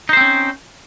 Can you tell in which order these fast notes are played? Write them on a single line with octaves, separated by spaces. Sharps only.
D#4 C5 C4 C#4